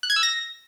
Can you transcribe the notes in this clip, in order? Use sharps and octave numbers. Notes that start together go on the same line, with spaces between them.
F#6
G#6
E6
A#6